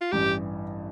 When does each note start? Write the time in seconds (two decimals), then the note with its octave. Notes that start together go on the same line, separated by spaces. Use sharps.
0.01 F4
0.12 A1 G2 E3 G4